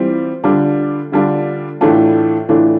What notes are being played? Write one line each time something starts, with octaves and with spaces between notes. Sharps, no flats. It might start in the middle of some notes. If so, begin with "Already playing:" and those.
Already playing: E3 G3 C4 F4
D3 G3 D4 F4
D3 G3 D4 F4
A2 E3 A3 D4 F4
A2 E3 A3 D4 F4